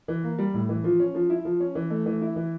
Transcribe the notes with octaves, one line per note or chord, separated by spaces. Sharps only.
E3
A#3
G3
A2
E3
F3
C#4
F3
E4
F3
C#4
E3
A3
E3
E4
E3